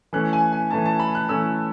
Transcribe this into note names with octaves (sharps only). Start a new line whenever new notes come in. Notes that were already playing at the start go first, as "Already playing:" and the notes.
E3 A3 C#4 F#6
G#5
G#5
E3 A3 C#4 A5
A5
B5
F#6
E3 A3 C#4 E6